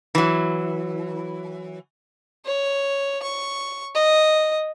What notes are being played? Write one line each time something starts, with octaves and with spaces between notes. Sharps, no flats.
E3 F#3
C#5
C#6
D#5